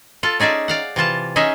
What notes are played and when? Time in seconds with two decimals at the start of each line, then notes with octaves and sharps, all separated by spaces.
0.23 F4 A4 A5
0.40 C#4 D#4 G#4 D5 E5
0.68 D5 F5 F#5
0.96 C3 E3 F4 A5
1.36 C#4 D#4 G#4 C#5 D#5 E5